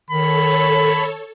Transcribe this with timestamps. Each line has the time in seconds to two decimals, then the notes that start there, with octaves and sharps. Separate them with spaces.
0.10 D#3 A4 C#5 B5